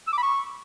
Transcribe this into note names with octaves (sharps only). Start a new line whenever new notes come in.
E6
D6
B5
C#6